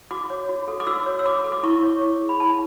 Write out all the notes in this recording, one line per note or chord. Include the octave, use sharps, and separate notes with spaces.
F#4 D6
C#5
F#4
A4
D6
F#4 E6
C#5
E6
F#4 D6
A4
D6
E4 C#6
C#5
E4
G#4
B5
E4 A5